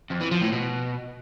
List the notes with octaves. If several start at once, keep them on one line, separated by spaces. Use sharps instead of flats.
F2
E3
F3
A2
B2